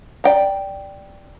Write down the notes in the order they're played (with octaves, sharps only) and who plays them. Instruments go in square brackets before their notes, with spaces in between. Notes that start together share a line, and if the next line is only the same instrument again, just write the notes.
[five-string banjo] D5 G5 A#5